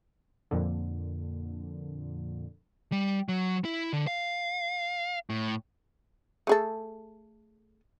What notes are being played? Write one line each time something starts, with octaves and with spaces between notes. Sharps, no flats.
F2 A#2 D3
G3
F#3
E4
D3
F5
A2
A3 G#4 A4